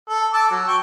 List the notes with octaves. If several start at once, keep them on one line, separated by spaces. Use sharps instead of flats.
A4
A5 D6 E6
F#3
G5 C#6